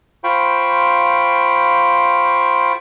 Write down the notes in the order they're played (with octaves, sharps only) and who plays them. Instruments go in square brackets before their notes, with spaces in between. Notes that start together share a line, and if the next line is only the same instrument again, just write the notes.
[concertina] F4 C5 F5 G5 B5 C#6